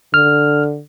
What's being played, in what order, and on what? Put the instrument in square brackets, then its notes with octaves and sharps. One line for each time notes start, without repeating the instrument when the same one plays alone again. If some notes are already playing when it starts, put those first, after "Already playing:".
[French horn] D3 [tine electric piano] F6